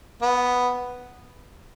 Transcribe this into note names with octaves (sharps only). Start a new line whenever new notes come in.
B3